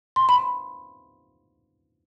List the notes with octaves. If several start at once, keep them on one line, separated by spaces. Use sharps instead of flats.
C6
B5